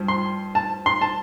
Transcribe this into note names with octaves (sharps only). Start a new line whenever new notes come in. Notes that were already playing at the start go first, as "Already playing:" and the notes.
Already playing: G2 F3
C6
A5
C6
A5